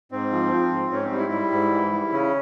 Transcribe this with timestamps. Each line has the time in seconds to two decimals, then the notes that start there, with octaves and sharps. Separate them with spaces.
0.12 G#2 C4
0.32 F3
0.51 F3
0.72 G#2
0.91 G#2 C#4
1.05 C4
1.11 G3
1.18 E4
1.32 G3
1.52 G#2
1.71 E3
1.92 G3
2.12 C#3 C#4